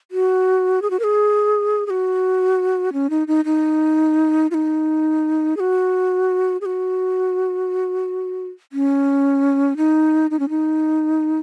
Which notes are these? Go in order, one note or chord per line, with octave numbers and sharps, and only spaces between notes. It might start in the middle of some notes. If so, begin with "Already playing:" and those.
F#4
G#4
F#4
A#4
G#4
G#4
F#4
C#4
D#4
D#4
D#4
F4
D#4
G#4
F#4
G#4
F#4
C#4
D#4
D#4
C#4
D#4